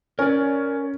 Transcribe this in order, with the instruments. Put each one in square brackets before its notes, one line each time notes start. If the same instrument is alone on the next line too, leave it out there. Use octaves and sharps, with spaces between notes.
[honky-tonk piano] C#4 [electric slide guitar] A#4 D5